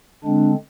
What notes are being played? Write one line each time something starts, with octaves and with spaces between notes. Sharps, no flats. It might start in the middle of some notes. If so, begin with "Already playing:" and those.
D3 G#3 C4 D4